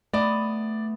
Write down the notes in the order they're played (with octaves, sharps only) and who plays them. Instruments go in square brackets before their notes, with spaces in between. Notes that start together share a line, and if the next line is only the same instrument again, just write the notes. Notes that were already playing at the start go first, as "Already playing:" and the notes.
[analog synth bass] A3 [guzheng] B3 D#5 A5 [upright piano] D5